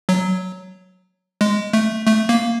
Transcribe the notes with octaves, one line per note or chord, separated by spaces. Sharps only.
F#3
G#3
A3
A3
A#3